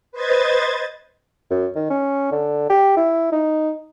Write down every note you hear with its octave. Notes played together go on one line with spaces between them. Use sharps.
B4 C5 D#5 G#6 A6
F#2
D#3
C#4
D3
G4
E4
D#4